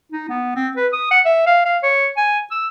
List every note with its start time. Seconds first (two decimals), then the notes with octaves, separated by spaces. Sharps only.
0.12 D#4
0.29 B3
0.55 C4
0.77 B4
0.93 D#6
1.11 F#5
1.25 E5
1.47 F5
1.65 F5
1.83 C#5
2.17 G#5
2.51 E6